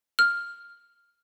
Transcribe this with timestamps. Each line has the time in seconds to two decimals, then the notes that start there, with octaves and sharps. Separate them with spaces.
0.19 F6